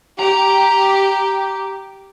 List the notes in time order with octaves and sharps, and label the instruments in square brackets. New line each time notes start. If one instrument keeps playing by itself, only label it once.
[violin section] G4 [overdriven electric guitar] A#5